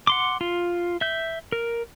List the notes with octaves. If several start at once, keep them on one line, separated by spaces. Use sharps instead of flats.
F#5 C6 D6
F4
E5 G6
A#4